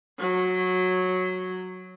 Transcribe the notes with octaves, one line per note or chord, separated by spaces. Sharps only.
F#3